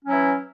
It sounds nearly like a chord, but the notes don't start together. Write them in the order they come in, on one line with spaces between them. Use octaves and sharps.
C#4 F#3 E4 E3